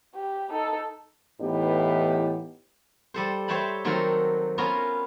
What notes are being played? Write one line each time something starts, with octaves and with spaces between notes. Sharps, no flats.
G4
D#4 A4
A2 E3 B3 D#4 G4
G3 A4 C5
C5 C#5 E5 G5 A5 B5
D#3 F#3 C4 F#4 A4 A#4
B3 C#4 F4 A#4 A#5